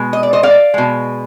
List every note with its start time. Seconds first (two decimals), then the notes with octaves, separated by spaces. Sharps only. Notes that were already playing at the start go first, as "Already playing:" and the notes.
Already playing: B2 G#3
0.13 D#5
0.23 D5
0.33 C5 D#5
0.43 D5 F5
0.74 B2 G#3